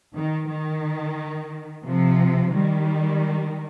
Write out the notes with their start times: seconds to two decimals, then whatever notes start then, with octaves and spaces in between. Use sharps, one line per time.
0.15 D#3
0.49 D#3
1.84 C3 F3
2.53 D#3 G3